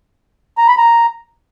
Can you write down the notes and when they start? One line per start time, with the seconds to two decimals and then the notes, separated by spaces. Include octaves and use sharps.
0.58 A#5
0.68 B5
0.78 A#5